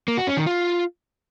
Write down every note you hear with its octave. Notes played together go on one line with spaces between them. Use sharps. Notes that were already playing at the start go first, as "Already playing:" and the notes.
A#3
F#4
C#4
D#3
F4